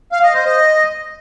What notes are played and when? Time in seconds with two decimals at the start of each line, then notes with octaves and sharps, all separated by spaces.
0.12 F5
0.23 D#5
0.34 C5
0.45 D#5